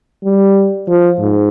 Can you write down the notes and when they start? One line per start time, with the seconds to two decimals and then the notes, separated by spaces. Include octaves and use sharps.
0.24 G3
0.88 F3
1.20 G#2